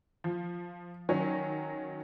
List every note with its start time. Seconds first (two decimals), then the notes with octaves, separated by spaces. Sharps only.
0.24 F3
1.09 D#3 F#3 C#4